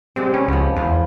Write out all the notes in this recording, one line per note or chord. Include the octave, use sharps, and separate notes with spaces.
C3 G#3 C4 D4
C#4 B4
C#2 F3 B3
E2 F4 B4 C5